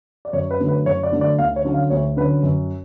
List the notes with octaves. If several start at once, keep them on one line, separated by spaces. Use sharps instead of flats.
D5
F#2 C#5
B4
D3 F#3 A3
B4
F#2 C#5
D5
D3 F#3 A3
D5
D2 F5
C#5
D3 F#3 C#4
F5
D2 C#5
D3 F#3 C#4 B4
F#2